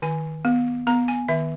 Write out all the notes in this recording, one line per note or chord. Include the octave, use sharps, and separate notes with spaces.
D#3 G#5
B3
B3 A#5
G#5
D#3 E5